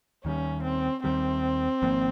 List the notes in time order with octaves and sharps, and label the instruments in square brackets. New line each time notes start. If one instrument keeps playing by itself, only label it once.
[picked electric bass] D#2 D#3 G3 [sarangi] C#4
[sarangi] C4
[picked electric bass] D#2 D#3 G3 [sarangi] C4
[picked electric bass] G#1 G#2 F3 A#3